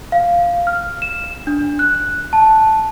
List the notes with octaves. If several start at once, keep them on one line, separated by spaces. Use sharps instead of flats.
F5
F6
E7
D4
F#6
A5